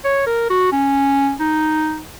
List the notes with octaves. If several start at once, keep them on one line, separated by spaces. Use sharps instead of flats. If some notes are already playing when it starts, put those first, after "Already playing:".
C#5
A#4
F#4
C#4
D#4